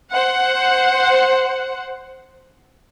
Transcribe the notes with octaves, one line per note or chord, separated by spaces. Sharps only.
C5 F#5